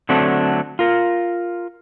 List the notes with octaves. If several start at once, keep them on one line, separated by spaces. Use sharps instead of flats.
D3 F#3 A3 C4 D4
F4 A#4